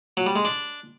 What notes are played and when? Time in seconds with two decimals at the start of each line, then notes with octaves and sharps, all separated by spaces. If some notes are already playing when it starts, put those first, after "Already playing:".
0.17 F#3
0.26 G3
0.36 G#3
0.45 D4